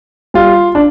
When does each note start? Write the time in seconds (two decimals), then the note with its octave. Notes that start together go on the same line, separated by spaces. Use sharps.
0.34 G3 F4
0.75 D4